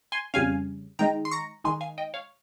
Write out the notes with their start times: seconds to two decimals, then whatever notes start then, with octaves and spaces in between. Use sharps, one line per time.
0.12 G#5 C6
0.34 F2 C#3 G3 C#4 F5 G#5
0.99 D#3 G#3 D#4 G5 A#5
1.25 C6
1.31 A#5 C#6
1.64 D#3 G#3 D#4 G#5 C6
1.81 F5 G#5
1.98 D#5 G5
2.14 C#5 F5